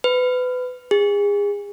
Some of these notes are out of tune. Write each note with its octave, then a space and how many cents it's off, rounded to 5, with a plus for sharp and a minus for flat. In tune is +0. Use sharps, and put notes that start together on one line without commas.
B4 +25
G#4 -30